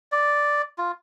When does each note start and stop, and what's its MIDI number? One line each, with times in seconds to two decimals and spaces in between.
0.12 0.62 74
0.78 0.92 65